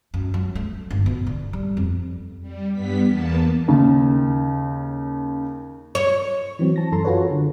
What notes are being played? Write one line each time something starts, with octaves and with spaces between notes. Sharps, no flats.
F#2
F#3
A3
G1
B2
D3
G3
F2
G3
G2 G3 B3 B6
E2 A#3 B3 A5
D#2 C#3
C#5
E3 F#3 C4
A5 A#6
F#2 E3 A4 A#5 C6
F4 F#4 G#4 A4 B4 C#5
D3